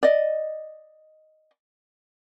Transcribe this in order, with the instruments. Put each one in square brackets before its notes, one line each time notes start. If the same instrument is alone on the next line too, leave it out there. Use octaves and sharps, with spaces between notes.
[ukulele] D5 D#5